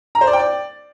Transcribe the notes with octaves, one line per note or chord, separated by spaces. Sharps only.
A#5
C5
D5
G5
D5